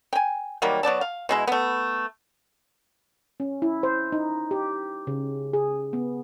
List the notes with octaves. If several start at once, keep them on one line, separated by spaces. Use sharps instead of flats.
G5 G#5
D#3 F#3 G3 A#3
F#3 B3 D5 A5
F5
B2 G#3 E4
A3 B3
C#4
E4
C5
D#4
G4
C#3
G#4
B3